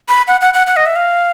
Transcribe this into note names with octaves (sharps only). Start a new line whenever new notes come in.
B5
F#5
F#5
F#5
F#5
D#5
E5
F5